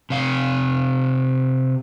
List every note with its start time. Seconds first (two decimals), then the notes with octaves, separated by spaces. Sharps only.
0.10 C3 F5